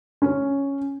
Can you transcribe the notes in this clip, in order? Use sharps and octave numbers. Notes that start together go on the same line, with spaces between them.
C#4